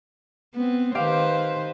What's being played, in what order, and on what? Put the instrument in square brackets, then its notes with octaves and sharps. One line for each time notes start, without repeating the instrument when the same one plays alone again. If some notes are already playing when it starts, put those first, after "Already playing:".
[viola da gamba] B3 C4
[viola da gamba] D#3 B4 C5 [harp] G4 F5 D7